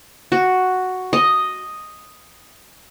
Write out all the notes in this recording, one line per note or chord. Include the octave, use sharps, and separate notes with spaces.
F#4
D#5